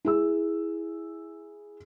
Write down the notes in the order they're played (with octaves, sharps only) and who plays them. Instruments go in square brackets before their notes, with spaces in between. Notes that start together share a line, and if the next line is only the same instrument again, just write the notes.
[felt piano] E4 G#4 E6